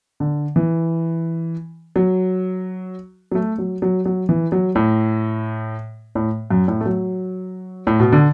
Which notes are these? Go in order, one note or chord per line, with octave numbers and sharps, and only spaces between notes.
D3
E3
F#3
F#3
A3
F#3
F#3
F#3
E3
F#3
A2
A2
F#2
A2
A3
F#3
A2
B2
D3